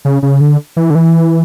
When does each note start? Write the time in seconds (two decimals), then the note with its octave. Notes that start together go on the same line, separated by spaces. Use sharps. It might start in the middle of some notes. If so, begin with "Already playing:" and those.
0.05 C#3
0.23 C#3
0.41 D3
0.76 E3
0.90 D3
0.95 E3